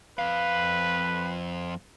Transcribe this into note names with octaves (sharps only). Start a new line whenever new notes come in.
F2 B4 F5